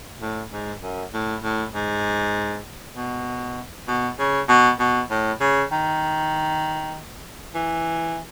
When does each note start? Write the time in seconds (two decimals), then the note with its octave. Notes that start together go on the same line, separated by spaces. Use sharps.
0.22 A2
0.52 G#2
0.82 F#2
1.14 A2
1.44 A2
1.75 G#2
2.96 B2
3.88 B2
4.19 C#3
4.49 B2
4.80 B2
5.10 A2
5.41 C#3
5.72 D#3
7.55 E3